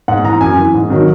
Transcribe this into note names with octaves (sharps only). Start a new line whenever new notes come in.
G#2 F#5
E3 A#5
F#2 G#5
E3
G#2
D#3 F#3